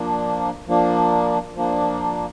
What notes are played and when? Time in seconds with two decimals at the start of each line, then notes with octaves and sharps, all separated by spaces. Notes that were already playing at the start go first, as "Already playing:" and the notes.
Already playing: F3 A#3 D4
0.67 F3 A#3 D4
1.55 F3 A#3 D4